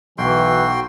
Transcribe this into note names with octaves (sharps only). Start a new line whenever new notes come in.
B1 E3 F#4 G5 C6